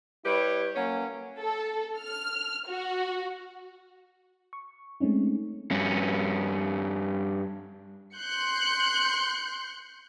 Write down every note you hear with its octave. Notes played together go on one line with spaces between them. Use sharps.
G3 E4 G4 B4 C#5
F#3 A#3 C#4
A4
F6
F#4
C#6
G#3 A3 C4 C#4 D#4
G2 C#4
C6 F#6 G6 C#7